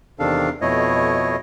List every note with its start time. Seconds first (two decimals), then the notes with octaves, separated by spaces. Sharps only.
0.19 E2 C3 D#3 D4 A4 F5
0.61 F2 B2 A3 E4 C#5 D#5